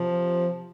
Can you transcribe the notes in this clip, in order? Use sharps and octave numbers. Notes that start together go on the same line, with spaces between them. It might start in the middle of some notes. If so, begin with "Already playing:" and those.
Already playing: C3 F3